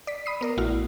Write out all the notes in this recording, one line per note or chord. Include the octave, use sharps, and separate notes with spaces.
D5 B6
B5 D#6 C7
B3 A#4 D5
A#1 A3 E4 F#4 F6